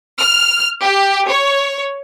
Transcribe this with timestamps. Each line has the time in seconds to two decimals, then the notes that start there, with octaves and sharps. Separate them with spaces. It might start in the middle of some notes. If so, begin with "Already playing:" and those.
0.19 F6
0.82 G4
1.28 C#5